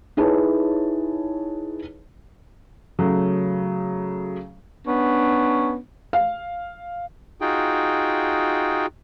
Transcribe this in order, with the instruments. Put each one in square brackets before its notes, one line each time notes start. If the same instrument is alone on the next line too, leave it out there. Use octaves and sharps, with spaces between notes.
[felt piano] D#4 E4 G#4 B4 C#5 A5
C#3 F#3 A3
[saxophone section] B3 C#4 D4
[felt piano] F5
[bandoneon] D#4 F4 F#4 G#4 G5